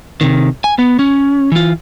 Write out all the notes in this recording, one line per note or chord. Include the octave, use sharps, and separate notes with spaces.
C3 D#3
G#5
B3
C#4
E3 F4